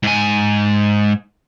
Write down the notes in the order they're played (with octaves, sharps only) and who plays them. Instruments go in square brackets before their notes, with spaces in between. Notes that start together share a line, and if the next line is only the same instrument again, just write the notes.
[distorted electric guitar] G#2 G#5